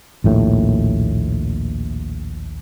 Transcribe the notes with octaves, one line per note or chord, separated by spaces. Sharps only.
A#1 D#2 A2